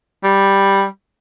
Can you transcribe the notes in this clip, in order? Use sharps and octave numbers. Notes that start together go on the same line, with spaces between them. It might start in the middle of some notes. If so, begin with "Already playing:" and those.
G3